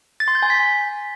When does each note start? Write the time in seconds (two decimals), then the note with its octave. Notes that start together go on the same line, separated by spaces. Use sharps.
0.20 A6
0.28 C6
0.35 G6
0.43 G#5
0.50 B6